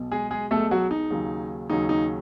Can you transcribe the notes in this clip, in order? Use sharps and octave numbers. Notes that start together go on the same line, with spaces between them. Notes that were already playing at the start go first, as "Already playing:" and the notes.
Already playing: B1 B2
G#3 G#4
G#3 G#4
B1 B2 G#3 A3 A4
F#3 F#4
D#4
D#2 C#3 F#3
D#2 C#3 F#3 D#4
D#4